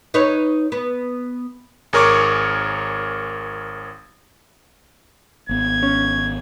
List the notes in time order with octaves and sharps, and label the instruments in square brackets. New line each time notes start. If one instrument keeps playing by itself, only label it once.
[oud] D#4 B4 C#5
B3
[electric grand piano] G#1 G#4 A#4 C#5 C#6 D6
[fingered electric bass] G#1 B3 [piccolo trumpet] G#6
[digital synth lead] C#4